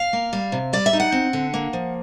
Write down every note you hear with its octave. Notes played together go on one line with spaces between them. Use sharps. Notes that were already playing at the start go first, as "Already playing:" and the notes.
Already playing: F5
A#3
G3
C3
G3 D5
E5
D#4
F#5
C4
D3
A#3
F3